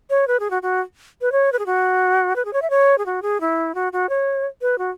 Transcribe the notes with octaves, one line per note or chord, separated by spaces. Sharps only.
C#5
B4
G#4
F#4
F#4
B4
C#5
B4
G#4
F#4
B4
G#4
C#5
E5
C#5
G#4
F#4
G#4
E4
F#4
F#4
C#5
B4
F#4